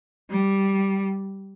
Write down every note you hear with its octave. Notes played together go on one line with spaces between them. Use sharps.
G3